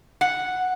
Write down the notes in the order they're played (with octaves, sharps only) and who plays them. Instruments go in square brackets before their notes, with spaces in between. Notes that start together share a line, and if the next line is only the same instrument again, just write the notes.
[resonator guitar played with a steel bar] F#5